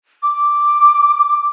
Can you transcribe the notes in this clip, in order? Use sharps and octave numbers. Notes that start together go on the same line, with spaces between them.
D6